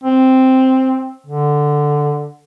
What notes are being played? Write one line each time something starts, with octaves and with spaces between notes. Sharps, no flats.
C4
D3